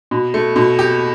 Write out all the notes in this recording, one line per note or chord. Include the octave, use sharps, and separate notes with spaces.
B2
A3
B2
G4